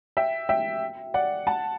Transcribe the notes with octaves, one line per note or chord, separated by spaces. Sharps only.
E5 G5
E5 G5
D5 F#5
F#5 A5